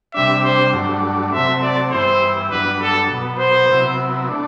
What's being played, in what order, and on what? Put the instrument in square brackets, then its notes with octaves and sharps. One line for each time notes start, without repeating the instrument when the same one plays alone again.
[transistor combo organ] C3 G3 D4 [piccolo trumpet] E5
[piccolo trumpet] C5
[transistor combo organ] G2 F#3 A3 D4
[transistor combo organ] C3 F#3 A3 C4 [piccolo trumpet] E5
[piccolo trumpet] D5
[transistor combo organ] G2 E3 B3 E4 [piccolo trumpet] C5
[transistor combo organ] G2 F#3 B3 D4 [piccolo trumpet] B4
[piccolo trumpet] A4
[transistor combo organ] B2 F#3 B3
[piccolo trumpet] C5
[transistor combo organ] C3 F#3 B3 E4
A3 D4